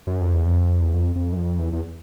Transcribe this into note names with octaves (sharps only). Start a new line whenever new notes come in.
F#2
F2
E2
F2
E2
F2
F2
F#2
F2
E2
E2